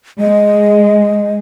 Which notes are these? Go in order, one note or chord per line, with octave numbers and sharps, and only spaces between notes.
G#3 D#5